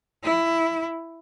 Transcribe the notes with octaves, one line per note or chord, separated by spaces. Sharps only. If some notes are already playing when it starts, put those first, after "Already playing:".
E4